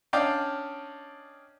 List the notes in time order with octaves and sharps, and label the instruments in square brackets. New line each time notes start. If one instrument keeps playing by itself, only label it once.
[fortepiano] C#4 D4 D5 D#5 F5 G5